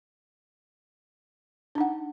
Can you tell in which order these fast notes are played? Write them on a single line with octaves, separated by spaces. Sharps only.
D4 D#4 F#5